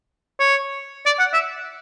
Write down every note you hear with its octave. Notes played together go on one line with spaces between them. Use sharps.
C#5
D5
F#5
E5